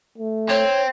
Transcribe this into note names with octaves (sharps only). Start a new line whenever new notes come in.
A3
C4 C#5